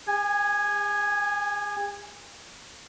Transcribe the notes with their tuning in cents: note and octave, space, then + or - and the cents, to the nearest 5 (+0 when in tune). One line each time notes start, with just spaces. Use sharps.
G#4 -45 G#5 +0